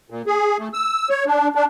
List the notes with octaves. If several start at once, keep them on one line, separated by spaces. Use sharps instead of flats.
A#2
G#4
A3
E6
C#5
D4
D4